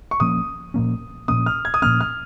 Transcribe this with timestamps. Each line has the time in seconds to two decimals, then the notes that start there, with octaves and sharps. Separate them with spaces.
0.11 C#6
0.20 A#2 F3 A#3 C#4 D#6
0.74 A#2 F3 A#3 C#4
1.28 A#2 F3 A#3 C#4 D#6
1.46 F6
1.65 G#6
1.74 D#6
1.82 A#2 F3 A#3 C#4 F6
2.01 F6